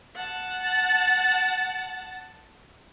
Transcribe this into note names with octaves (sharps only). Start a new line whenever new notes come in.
F#5 A5